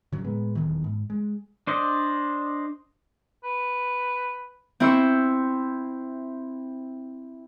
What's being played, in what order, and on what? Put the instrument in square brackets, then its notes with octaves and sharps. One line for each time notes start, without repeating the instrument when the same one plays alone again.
[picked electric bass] C#3 F#3
A2 G#3 B3
D#1 B1 E2 D#3
G#2
G#3
[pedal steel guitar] D4 C5 D5 D#5
[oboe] B4
[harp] C4 E4 C5 C#6 E6